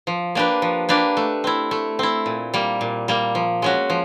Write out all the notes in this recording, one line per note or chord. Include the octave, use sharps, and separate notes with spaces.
F3
A#3 D4 G4 B4
F3
A#3 D4 G4 B4
A3
C4 E4
A3
C4 E4
A#2
G3 A#3
A#2
G3 A#3
F3
G#3 C#4 F#4
F3